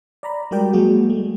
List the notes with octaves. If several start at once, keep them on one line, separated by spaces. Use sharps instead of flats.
D5 A#5 B5
G3 G#3 F#4 A#4 D5 G5
F#3 G#3 A#3 F#4 G#4
G#3 A3